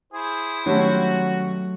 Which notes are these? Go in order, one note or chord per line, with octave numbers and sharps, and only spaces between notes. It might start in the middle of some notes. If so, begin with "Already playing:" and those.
E4 G#4 C5
D#3 F#3 G3 A3 C#4 F#4